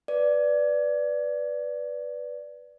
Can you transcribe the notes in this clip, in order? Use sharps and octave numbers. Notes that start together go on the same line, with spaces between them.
B4 D5